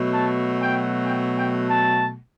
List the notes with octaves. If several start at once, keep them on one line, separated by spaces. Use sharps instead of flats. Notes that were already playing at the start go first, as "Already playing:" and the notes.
Already playing: B2 F#3 A3
A5
G5
G5
G5
A5